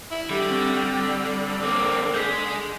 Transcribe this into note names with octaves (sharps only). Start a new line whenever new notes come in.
E4
D3 G3
C4
A#3 C4 D6
G#3 G6 B6